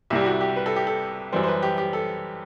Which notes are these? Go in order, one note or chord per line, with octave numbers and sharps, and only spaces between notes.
C2 C3 G3 E4
G4
F#4
G4
B4
A4
G4
A4
F#2 E3 G3 C5
C5
B4
G4
G4
A4